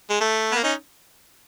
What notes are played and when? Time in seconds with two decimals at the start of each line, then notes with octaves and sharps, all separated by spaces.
0.10 G#3
0.21 A3
0.52 B3
0.55 A#3
0.64 C#4 D#4